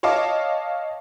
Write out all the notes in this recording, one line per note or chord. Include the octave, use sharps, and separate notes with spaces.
C#5 D#5 F5 A5 D6